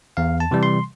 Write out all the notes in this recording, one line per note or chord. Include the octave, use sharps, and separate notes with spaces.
E2 F5
A5
C3 E3 G3
C6